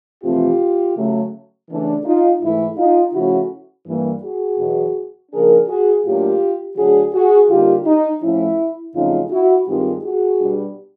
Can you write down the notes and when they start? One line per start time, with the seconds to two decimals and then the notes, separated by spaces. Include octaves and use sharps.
0.23 F2 C3 E3 A3 C4 F4 G4
0.96 C#3 F#3 A3
1.69 C#3 E3 A3 D4
2.05 D#4 F4
2.41 G#2 E3 A3 E4
2.77 D#4 F4
3.13 C#3 F3 A3 C#4 E4 F#4
3.86 G2 E3 G3 A#3
4.23 F#4 G#4
4.59 E2 B2 F#3 B3
5.32 C#3 F3 A#3 D4 G#4 A#4
5.68 F#4 G#4
6.04 A2 F#3 A#3 D4 F4 G4
6.77 D3 F#3 A3 D4 F#4 G#4
7.13 F#4 G#4
7.49 D3 G3 A#3 D#4 F4 G4
7.86 D#4
8.22 A2 F3 A3 C#4 E4
8.95 F2 C#3 F#3 A3 C#4 D#4 F4
9.31 E4 F#4
9.67 G2 D#3 G#3 C4 D#4 F4 G4
10.03 F#4 G#4
10.40 B2 G3 B3 D4